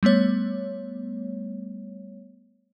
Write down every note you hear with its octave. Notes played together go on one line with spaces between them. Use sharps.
G3 A3 B3 C#5